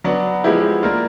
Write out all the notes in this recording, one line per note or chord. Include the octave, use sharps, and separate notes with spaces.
F#3 B3 D4
F3 G#3 B3 E4 G4
A#3 D4 F4